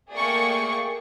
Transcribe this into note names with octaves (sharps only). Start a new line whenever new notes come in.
A3 A#3 G#4 D5 G5 C#6